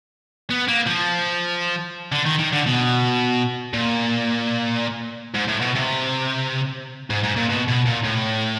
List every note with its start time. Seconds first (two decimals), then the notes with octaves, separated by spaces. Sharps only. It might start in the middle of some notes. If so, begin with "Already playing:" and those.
0.51 B3
0.68 A#3
0.87 F3
2.12 D3
2.26 D#3
2.39 D#3
2.52 D3
2.66 B2
3.73 A#2
5.35 G#2
5.48 A2
5.61 B2
5.76 C3
7.10 G#2
7.23 G#2
7.37 A#2
7.50 B2
7.68 B2
7.86 A#2
8.04 A2